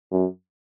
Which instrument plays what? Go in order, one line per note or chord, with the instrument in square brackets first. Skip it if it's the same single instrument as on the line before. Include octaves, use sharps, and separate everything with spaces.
[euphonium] F#2